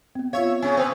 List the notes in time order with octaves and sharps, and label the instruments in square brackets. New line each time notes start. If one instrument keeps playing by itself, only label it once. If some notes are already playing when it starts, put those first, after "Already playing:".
[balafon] B3 C4
[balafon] F4 F5 [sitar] C#5 E5
[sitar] C#3 C#4 [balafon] G#5
[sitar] C4 B4 [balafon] C5